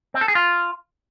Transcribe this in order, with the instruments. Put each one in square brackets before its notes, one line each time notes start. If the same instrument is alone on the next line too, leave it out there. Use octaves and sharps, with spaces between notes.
[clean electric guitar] C4
A4
G#4
F4